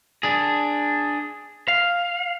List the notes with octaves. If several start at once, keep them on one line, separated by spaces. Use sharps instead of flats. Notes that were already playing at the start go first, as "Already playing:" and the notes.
D4 G#4
F5